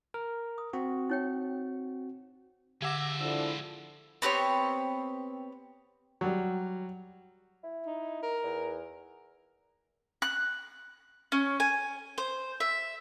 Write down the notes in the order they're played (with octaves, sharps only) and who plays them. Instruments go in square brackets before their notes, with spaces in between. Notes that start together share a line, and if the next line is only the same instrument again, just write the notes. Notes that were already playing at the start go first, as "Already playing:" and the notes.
[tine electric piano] A#4
[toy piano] D#6
[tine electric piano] C4 F#4
[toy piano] D#4 C#5 G5
[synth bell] D3 F#5 A#6 [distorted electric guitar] G#3 E5 [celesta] D6 E6 G#6
[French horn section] F3 D4 E4 [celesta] A4 E6
[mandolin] B3 C4 G4 C#5
[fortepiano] F#3 G3
[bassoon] E4
[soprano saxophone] D#4
A#4
[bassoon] E2
[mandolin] F#6
C#4
G#5
C5
E5